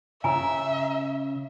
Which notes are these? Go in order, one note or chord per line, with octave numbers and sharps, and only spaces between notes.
C#3 E5 G#5 A#5